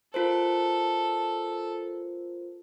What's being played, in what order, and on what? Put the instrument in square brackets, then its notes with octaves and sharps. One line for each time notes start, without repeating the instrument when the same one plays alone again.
[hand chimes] F4 A#4 C5 [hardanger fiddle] A4